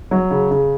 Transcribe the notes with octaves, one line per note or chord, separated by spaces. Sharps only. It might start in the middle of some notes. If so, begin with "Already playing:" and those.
F#3
C#3
C#3